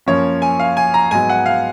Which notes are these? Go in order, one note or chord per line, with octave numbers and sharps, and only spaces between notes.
F#2 F3 A#3 C#4 C#5
G#5
F5
G#5
A#5
G#2 F#3 B3 G#5
F#5
F5